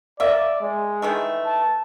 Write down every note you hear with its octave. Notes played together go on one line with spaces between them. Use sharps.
A#3 D5 E5
G#3
D#3 E3 A3
A5